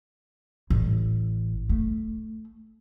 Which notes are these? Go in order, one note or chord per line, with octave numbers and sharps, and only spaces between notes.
A1
A3